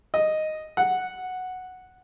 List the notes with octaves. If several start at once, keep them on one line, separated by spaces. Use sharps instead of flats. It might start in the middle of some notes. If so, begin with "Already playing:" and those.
D#5
F#5